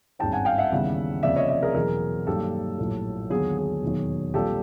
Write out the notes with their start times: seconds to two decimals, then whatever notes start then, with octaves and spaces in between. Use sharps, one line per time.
0.19 G#1 G2 D#3 G#3 C#4 G5 A5
0.33 F#5 G#5
0.45 F5 G5
0.58 E5 F#5
0.71 D#2 C#3 E3 G3 B3
1.23 F1 F2 C#3 F3 A#3 D5 E5
1.36 C#5 D#5
1.49 D5 E5
1.63 G#4 A#4
1.75 E2 B2 F#3 G#4 A#4
2.26 G2 D#3 F#3 A#3 G4 A4
2.78 A#1 A2 F#3 A3
3.30 D#2 D3 F#3 B3 G#4
3.57 G#4
3.82 E1 D#2 D#3 F#3
4.34 A#1 A#2 G3 C4 G4 A4